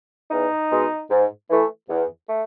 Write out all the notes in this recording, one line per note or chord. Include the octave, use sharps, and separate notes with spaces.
E2 D#4
B2 G#3
G#2
E3 A3
E2
A3